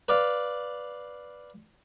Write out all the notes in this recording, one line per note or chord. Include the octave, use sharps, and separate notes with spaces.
B4 D5 F5